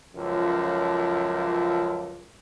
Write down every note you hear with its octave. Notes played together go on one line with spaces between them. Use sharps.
C#2 F#2 F3